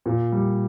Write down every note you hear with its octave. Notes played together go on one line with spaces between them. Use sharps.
A#2
G3